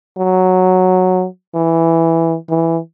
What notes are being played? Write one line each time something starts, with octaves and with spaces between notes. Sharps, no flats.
F#3
E3
E3